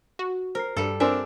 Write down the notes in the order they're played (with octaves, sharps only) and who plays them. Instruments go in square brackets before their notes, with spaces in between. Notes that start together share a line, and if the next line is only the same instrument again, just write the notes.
[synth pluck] F#4
[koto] A#4 [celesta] C5 F6 C7
[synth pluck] G2 [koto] G3 A4
[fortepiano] C4 D4 A#4 [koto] E5 [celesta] G#5 D6 E6